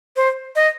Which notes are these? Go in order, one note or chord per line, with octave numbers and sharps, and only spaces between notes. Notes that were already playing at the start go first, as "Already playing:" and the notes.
C5
D#5